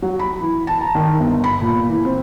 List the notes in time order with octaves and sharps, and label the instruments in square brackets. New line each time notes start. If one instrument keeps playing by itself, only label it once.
[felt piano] F#3
B5
E3
A5
A#5
D#3
G1
B5
A#2
E3
C4